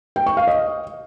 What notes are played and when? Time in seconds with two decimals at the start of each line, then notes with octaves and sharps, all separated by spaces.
0.16 G5
0.26 C#6
0.37 F5
0.47 D#5